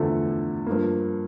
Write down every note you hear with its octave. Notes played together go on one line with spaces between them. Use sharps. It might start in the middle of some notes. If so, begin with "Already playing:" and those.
Already playing: E2 D3 F3 A3 A4
G2 F3 A#3